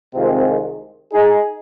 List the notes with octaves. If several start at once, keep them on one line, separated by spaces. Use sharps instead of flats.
C2 C3 D#3 G#3 C4 F4
D#4 G#4